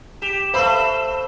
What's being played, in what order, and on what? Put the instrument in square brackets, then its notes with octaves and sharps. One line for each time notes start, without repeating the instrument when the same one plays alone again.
[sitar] G4 [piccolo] E7
[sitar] A3 B4 C5 [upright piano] F5 B5 E6